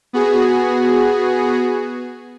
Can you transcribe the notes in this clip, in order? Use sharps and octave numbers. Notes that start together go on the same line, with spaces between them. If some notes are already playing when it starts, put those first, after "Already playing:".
B3 F#4 G#4